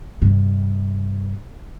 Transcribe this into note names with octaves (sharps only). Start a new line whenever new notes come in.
G2 C3